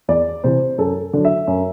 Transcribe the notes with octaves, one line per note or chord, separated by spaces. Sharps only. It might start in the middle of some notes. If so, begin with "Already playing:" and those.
E2 D5
C3 E3 C5
F#2 A4
D3 F#3
E5
F#2